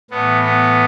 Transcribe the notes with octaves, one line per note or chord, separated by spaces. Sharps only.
A2 E3 B3
B3